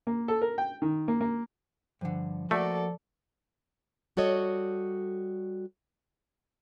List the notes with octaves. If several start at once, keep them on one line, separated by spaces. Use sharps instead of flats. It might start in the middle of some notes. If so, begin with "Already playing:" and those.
A#3
A4
A#4
G5
D#3
A#3
A#3
G2 D3 F3
A3 A#3 F#4 A4 D5
G3 F#4 A4 C#5 D#5